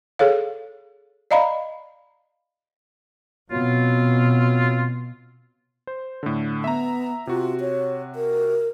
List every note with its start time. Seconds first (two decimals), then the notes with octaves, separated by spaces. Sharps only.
0.19 G#4 A4 C#5 F5
1.31 D5 D#5 F5 A#5 B5
3.51 B2 F#3 C4 F4
5.87 C5
6.23 A2 D3
6.64 B3 E5 A#5
7.27 C3 F4 F#4
7.60 C#5
8.15 A#4